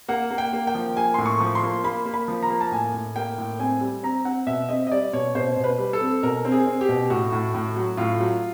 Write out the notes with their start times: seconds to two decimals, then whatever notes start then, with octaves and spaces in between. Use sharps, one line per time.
0.08 A#3 F#5
0.31 A#3
0.38 G5
0.53 A#3
0.67 G5
0.75 F3
0.96 A#3 G#5
1.14 A2 C6
1.26 C#6
1.40 F3
1.55 C6
1.63 A#3
1.84 A#3 B5
2.05 A#3
2.14 B5
2.28 F3
2.43 A#5
2.50 A#3
2.61 A5
2.71 A2 G#5
2.94 A2
3.16 A#3 G5
3.38 A2
3.59 C4 G#5
3.81 G3
4.03 C4 A#5
4.25 C4 F#5
4.47 B2 E5
4.69 C4 D#5
4.87 D#5
4.91 G3 D5
5.13 B2 C#5
5.35 B2 C5
5.56 B2
5.64 B4
5.78 G3
5.93 A4
6.01 C4
6.23 B2 A#4
6.45 C4
6.52 G#4
6.67 C4
6.81 G4
6.89 B2
7.10 A2 F#4
7.32 A2
7.54 A2
7.76 F#3
7.97 A2 F4
8.20 F#3